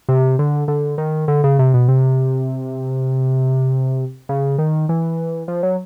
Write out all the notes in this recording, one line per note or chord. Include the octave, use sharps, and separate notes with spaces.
C3
D3
D3
D#3
D3
C#3
C3
B2
C3
C#3
D#3
E3
F3
F#3